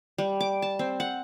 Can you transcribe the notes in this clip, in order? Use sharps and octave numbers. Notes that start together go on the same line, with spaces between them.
G3
D6
A5
C4
F#5